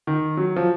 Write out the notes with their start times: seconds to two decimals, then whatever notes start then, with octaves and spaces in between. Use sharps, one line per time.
0.07 D#3
0.37 F#3
0.56 F3